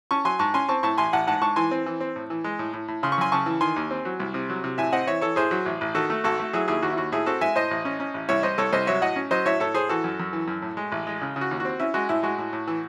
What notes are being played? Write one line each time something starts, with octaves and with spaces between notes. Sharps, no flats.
C#4 A5 C#6
F#3 G#5 C6
G#2 A5 C#6
C#4 G#5 C6
C4 A5 C#6
A2 A5 C#6
A1 G#5 C6
A1 F#5 A5
G#2 F#5 A5
G#2 A5 C#6
E3 G#5 C6
C4
E3
C4
A2
E3
G#3
A2
A2
A2
C#3 C6
C#6
F#2 G#5 C6
C#3 A5 C#6
E3
D#3 G#5 C6
D#2
C4
F#3
C2
C3
F#3
C3
A2 E5 G#5
C4 D#5 F#5
E3 C#5 E5
E3 A4 C#5
A1 G#4 C5
F#3
A1
A1
D#3 F#4 A4
A3
G#1 F#4 A4
A3
F#3 E4 G#4
D#2 E4 G#4
D#2 F#4
E4
D#2 F#4
A2 E4 G#4
C4 F#4 A4
G#3 E5 G#5
A2 C5 D#5
A1
C#4
C#4
A1
C2 C#5 E5
C2 C5 D#5
C2 A4 C#5
C2 C5 D#5
F#3 C#5 E5
A2 D#5 F#5
C#4
F#3 C5 D#5
A2 C#5 E5
A2 A4 C#5
A2 G#4 C5
E3 F#4 A4
F#2
F#2
E3
F#2
A2
G#3
A1
G#3
C#3
C#3
F#4
D#2
C4 F#4
C#4 E4
G#3 F#4
A2 E4
G#3 F#4
A2
A2
E3